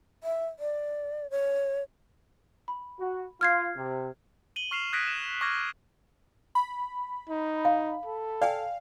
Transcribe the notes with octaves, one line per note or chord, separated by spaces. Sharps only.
E5
D5
C#5
B5
F#4
F4 F6 G#6 C7
C3
D#7 F#7 G7
C#6 F6 C7 E7 F7
D#6 F#6 G#6 A#6 B6 D7
E7
C#6 D6 F6 G#6 A#6 B6
B5
D#4
F5
A4
D5 F5 G5 G#5